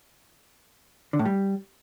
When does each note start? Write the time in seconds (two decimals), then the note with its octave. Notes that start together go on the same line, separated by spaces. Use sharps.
1.13 D3
1.19 A2
1.25 G3